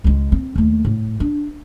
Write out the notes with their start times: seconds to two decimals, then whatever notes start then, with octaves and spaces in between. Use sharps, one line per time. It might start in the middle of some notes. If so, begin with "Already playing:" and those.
0.04 C#2 G#3
0.32 C4
0.56 D#2 A3
0.85 A2
1.20 D4